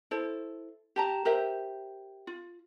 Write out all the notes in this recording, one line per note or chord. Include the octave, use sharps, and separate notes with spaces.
E4 A4 C5
G4 A5 A#5
G4 A#4 C5 E5
F4